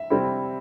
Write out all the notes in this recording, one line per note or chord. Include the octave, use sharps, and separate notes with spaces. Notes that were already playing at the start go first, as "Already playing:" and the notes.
Already playing: E5
C3 G3 C4 E4